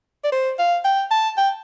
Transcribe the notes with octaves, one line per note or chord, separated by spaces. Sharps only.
D5
C5
F5
G5
A5
G5